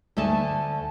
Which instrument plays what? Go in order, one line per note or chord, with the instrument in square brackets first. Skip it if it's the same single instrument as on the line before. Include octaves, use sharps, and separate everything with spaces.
[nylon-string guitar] D2 A3 G#5 A5